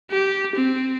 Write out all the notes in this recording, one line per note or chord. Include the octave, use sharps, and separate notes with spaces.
G4
C4